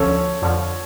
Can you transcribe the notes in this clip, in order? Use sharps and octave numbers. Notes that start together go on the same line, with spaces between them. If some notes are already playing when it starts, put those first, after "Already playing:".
Already playing: D2 D3 F3 C#4 A4 C#5
F2 D3 F3